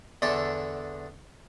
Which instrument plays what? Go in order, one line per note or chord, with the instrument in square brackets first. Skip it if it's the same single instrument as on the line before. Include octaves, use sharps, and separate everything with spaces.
[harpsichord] E2 D3 D4 A4